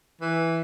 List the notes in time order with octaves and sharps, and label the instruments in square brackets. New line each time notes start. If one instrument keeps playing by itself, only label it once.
[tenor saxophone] E3